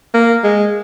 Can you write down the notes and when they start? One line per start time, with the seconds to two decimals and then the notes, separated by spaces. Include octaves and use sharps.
0.14 A#3
0.44 G#3